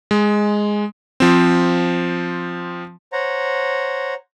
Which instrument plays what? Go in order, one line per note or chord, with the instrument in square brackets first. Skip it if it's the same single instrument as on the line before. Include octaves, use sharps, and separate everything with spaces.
[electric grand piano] G#3
F3 C4
[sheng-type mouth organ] C5 C#5 F#5 A#5